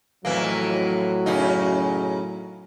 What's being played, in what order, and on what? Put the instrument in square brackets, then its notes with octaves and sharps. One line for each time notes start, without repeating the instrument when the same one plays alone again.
[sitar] F2 E3 A#3 [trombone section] A2 F#3
[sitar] F#2 C#3 D#4